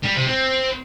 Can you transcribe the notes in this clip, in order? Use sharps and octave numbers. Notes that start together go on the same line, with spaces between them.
G3
C3
C4